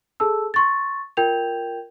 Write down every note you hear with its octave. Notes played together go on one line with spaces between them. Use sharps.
G#4 A4 A5 E6
C6 C#6 A6
F4 A#4 G5 G6 G#6 F7